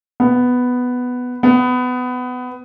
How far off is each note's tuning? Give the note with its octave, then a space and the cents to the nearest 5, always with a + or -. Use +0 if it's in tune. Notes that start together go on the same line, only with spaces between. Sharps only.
B3 +5
B3 +20